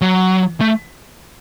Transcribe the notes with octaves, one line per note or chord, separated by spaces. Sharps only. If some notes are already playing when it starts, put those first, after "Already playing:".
F#3
A3